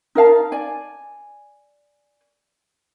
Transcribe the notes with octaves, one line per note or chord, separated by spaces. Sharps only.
D#4 A#4 F5 A5
D5 G#5